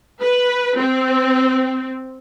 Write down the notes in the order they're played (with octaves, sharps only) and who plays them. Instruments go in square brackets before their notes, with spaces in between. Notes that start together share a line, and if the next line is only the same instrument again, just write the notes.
[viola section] B4
C4